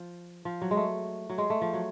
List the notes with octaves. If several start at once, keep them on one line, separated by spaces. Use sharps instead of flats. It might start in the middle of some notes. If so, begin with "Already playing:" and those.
Already playing: F3
F3
F#3
G#3
A3
F#3
G#3
A3
F3
F#3